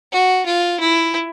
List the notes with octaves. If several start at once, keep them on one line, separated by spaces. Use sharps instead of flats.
F#4
F4
E4